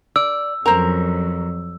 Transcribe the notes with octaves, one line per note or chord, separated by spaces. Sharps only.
D5 E6
F2 F#3 C#4 A#4 C5 A#5